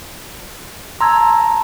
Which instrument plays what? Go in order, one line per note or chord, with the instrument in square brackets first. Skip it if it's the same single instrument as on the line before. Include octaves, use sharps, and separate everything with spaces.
[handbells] A5 A#5 [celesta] C6 E6 G#6